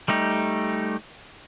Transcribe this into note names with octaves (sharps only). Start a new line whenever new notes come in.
G3 A3 D#4 G4